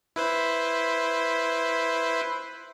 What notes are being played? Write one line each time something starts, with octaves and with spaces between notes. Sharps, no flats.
E4 B4 C5